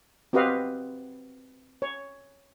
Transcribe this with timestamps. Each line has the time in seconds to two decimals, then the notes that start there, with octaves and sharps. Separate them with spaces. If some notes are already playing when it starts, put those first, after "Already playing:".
0.33 C4 F#4 G4 B4 D#5 F5
1.82 C#5